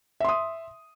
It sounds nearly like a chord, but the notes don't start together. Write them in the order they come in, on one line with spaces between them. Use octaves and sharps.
E5 C6 D#6